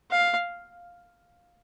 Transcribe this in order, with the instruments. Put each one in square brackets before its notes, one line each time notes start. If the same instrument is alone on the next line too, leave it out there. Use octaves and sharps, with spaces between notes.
[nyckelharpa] F5